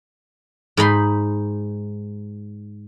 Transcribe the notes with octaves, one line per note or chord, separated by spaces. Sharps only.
G#2 D#4 B5 C6